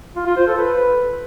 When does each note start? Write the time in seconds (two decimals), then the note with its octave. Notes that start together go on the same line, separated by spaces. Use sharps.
0.16 F4
0.26 F4
0.37 C5
0.47 A4
0.57 B4